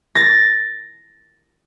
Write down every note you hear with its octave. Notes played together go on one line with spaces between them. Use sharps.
A6 A#6